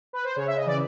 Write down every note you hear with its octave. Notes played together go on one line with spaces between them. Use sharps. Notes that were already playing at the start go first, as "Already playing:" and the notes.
B4
C5
C#3 C#5
E5
D#5
E3 D5